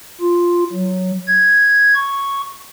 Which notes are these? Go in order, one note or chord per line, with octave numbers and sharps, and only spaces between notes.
F4
F#3
G#6
C#6